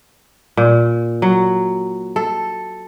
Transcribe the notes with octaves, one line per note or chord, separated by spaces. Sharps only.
A#2
F#3
A4